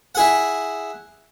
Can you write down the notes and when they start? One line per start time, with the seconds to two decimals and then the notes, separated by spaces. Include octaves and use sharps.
0.15 E4 G#4 F#5